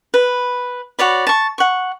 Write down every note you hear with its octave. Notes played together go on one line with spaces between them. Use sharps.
B4
F#4 C#5 D5 B5
A5 C#6
F#5 C#6